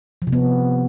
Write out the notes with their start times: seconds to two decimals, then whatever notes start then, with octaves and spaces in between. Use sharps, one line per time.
0.22 F3
0.27 C3
0.33 B3